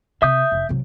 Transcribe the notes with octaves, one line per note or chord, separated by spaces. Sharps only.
C3 E5 D#6 G6
F1
C3 F#3